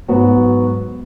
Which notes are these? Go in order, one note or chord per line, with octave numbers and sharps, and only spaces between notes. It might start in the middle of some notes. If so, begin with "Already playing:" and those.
G#2 F#3 B3 F#4